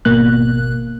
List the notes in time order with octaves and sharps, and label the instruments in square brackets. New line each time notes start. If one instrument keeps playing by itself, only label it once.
[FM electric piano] G#1 B2 A#3 F#6